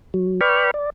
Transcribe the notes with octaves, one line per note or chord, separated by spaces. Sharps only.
F#3
B4 D5 G5 B5 C#6 F6
D5